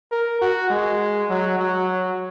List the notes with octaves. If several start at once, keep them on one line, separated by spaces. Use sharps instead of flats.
A#4
F#4
G#3
F#3
F#3